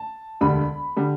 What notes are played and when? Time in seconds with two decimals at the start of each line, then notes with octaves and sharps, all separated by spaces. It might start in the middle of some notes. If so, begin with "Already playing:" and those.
Already playing: A5
0.41 E1 D2 D3 G3 B5
0.96 D3 G3